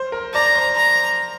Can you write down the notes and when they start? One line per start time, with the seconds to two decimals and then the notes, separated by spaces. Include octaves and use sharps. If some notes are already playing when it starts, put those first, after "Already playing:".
Already playing: C5
0.12 A#4
0.34 D5 A#5
0.55 C5
0.76 A#5